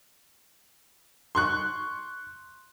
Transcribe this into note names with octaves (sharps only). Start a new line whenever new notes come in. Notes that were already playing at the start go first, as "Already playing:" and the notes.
C6 C#6 F#6